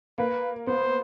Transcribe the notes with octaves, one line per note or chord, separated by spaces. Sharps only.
A#3 B4
B3 C5